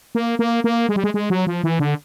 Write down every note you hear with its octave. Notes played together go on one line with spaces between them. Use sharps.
A#3
A#3
A#3
G#3
G3
G#3
G#3
F#3
F3
E3
D3